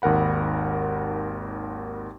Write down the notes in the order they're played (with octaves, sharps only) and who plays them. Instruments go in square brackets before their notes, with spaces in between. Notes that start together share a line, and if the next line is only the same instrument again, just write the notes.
[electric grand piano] G#1 D#2 A#4 F#5 B5